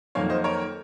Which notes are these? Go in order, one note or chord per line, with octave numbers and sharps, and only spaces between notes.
F2 D#3 F#3 A#3 C#5 F5
C5 D#5
A#4 C#5